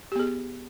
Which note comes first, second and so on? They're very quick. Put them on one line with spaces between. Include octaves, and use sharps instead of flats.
G4 B3 G#4